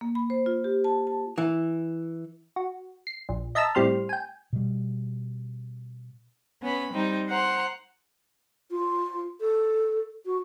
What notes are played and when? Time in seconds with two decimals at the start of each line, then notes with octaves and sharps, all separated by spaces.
0.01 A#3
0.15 B5
0.30 C5
0.46 F4
0.64 G4
0.84 A5
1.07 A5
1.38 E3
2.56 F#4
3.07 C7
3.29 A#1
3.55 D#5 E5 A5 A#5 E6
3.75 A2 G3 C4 C6 F6
4.09 G5 G#5
4.53 B2 G3
6.62 B3 C#4 B5
6.92 G3 C4 D#4
7.28 C5 F#5 A#5 C6
8.71 F4
9.40 A4
10.25 F#4